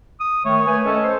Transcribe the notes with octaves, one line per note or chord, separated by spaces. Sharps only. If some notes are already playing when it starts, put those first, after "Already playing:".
D#6
D#3 A3 C#5
A3 B4 G#5
A3 C#4 A4 C#5 D#5
C5